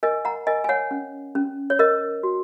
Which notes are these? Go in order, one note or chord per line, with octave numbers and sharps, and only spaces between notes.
A#4 D#5 G#5
F#5 A#5
A#4 D#5 G#5
G#5
C#5 F#5
C#4
C#4
C#5
A#4 D#5
F#4